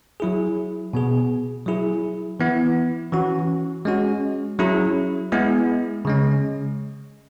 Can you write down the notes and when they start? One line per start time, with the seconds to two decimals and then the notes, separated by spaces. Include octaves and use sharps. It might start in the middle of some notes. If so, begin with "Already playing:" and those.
0.20 F#3 E4 G#4
0.93 B2 B3 G#4
1.66 F#3 E4 G#4
2.40 E3 B3 E4
3.12 E3 C#4 F#4
3.85 G#3 C#4 F#4
4.59 F#3 C#4 E4 G#4
5.32 G#3 B3 E4 G#4
6.05 C#3 G#3 C#4